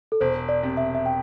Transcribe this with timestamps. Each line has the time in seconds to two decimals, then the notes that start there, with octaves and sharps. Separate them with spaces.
0.12 A4
0.21 E1 C5
0.49 D5
0.63 C3
0.77 E5
0.95 E5
1.06 G5